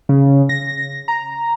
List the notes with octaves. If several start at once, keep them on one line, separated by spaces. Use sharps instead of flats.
C#3
A#6
A#5